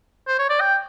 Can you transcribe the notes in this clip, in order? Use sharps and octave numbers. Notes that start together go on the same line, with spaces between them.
C5
C#5
D5
G5